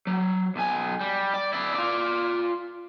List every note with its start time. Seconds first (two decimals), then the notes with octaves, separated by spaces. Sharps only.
0.07 F#3
0.56 B1 G#5
1.01 G3
1.34 D5
1.53 E4 D5
1.74 F4 D5